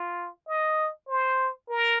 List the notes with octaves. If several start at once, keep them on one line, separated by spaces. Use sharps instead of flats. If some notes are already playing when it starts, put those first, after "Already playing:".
Already playing: F4
D#5
C5
A#4